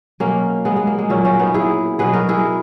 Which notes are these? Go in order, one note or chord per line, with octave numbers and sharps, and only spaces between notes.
B2 F#3 A#3 C#4
G#3 B3
G#3
A#3
G#3
A#2 F#3 A#3 C#4
A#3 C#4
B3 D#4
E4 G#4
B2 F#3 G#4 B4
F#4 A#4
E4 G#4